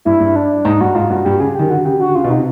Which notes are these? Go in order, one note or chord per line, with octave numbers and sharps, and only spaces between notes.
G2 E4
G2
D4
G#2 D#4
G2 F#4
G#2 F4
G2 F#4
G2 G4
C#3 G#4
D#3 G4
D3 F#4
C#3 G4
D3 F#4
C#3 F4
B2
C3 D#4